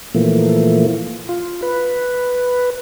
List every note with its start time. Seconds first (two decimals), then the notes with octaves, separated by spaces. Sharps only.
0.15 A#2 E3 F3 A3 A#3
1.29 F4
1.62 B4